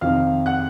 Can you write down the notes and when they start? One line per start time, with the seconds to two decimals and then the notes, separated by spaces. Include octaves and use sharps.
0.01 F2 C3 D#3 F5 F6
0.46 F#5 F#6